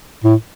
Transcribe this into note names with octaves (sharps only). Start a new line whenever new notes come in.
A2